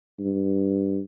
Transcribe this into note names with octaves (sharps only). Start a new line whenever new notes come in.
G2